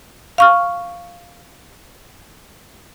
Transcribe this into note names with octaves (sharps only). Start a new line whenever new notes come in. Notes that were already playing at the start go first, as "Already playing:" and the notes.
F5 C#6 F6